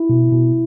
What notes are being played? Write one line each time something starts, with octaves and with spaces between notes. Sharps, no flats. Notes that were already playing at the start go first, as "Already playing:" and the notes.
Already playing: E4
B2
B2